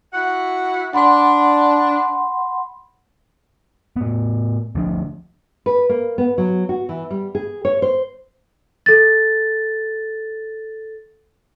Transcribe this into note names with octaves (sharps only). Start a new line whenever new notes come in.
E4 F#4 F#5
D4 F#5 B5 C6
A2 B3
D2 F3 D4
B4
A#3
B3
F#3
F#4
E3
G3
G#4
C#5
C5
A4 A6